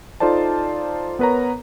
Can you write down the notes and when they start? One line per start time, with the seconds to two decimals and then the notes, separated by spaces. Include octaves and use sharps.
0.20 D#4 F4 A4 C5 D5 A5
1.19 B3 A#4 B4 C#5 A#5